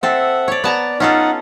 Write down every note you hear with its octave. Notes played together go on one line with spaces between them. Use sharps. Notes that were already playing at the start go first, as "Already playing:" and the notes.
C4 A4 E5 F#5
C#5 D5
B3 D5 A5 A#5
C#4 D#4 F4 A4 F#5